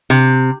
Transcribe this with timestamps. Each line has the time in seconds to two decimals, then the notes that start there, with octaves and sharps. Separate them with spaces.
0.10 C3